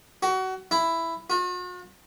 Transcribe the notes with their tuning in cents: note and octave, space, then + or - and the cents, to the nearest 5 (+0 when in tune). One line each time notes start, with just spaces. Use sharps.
F#4 +25
E4 +5
F#4 -45